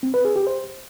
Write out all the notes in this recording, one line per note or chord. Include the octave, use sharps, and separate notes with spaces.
C4
B4
G#4
G4
C5